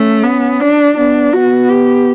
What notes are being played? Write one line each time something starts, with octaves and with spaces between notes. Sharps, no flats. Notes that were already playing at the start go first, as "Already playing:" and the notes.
Already playing: A3 C#4
B3
D4
B3 D4
B3 F#4
G4